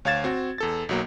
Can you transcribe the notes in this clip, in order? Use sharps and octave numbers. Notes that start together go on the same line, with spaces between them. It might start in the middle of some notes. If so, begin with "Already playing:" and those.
D2 C#5 F5 G#6 A6 E7
C4 F#4
E2 A4 A6
B1 F#3 A#3